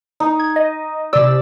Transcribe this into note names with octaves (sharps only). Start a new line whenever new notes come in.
D#4
G#6
D#5
C3 D5 E6